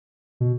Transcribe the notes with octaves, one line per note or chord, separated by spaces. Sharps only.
B2